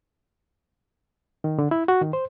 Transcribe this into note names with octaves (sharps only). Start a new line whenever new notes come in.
D#3
D3
E4
F#4
D#3
C5